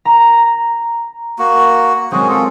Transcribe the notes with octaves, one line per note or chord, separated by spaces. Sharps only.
A#5
A#3 F#4
G#3 C4 C#4 F#4 G#4
F4 A4